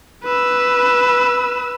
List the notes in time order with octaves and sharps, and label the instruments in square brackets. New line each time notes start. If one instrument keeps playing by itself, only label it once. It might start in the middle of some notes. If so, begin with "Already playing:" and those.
[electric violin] B4 E6